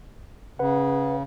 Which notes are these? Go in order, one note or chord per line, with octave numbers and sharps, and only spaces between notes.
C#3 B4 F#5